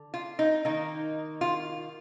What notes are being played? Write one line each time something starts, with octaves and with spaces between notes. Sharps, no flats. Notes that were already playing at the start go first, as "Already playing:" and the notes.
Already playing: D3
F4
D#4
D#3 A#3 D#4
F4